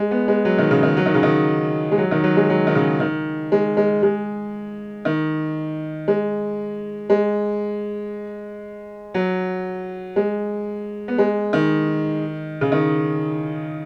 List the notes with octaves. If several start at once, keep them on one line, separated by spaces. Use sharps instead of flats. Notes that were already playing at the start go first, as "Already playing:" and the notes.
Already playing: G#3
B3
G#3
F#3
D#3
C#3
D#3
F#3
D#3
C#3
D#3
G#3
F#3
D#3
F#3
G#3
F#3
D#3
C#3
D#3
G#3
G#3
G#3
D#3
G#3
G#3
F#3
G#3
B3
G#3
D#3
C#3
D#3